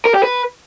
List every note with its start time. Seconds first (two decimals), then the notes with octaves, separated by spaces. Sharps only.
0.05 A#4
0.14 G4
0.23 B4